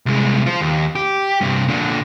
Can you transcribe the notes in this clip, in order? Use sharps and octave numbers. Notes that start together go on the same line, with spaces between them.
C2 G#3
F4 C5
D#2
G4
G2 C3
A#2 D3